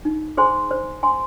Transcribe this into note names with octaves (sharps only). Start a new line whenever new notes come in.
D#4
G#4 C5 G#5 C6
C5
G#5 C6